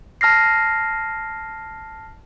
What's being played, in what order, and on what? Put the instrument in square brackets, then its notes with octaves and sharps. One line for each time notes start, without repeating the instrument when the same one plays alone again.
[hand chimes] A5 F6 A#6 C7